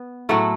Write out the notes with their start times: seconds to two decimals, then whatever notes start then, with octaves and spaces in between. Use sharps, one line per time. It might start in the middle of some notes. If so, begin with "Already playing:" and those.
Already playing: B3
0.29 A2 F#3 A3 E4